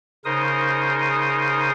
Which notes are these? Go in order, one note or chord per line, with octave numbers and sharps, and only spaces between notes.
C#3 D#4 A#4 C5 D#6